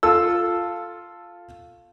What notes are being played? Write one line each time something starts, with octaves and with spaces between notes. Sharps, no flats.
F4 A4 E6